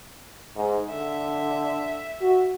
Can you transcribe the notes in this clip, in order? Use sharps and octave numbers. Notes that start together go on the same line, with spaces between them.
G#2
D3 E5
F#4